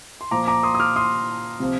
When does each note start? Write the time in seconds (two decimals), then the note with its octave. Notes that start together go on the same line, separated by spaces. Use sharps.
0.21 C6
0.31 A#2 F3 A#5 D6
0.47 A#5 D6
0.63 C6 D#6
0.74 D#6
0.80 D6 F6
0.96 C6 D#6
1.60 C3 F3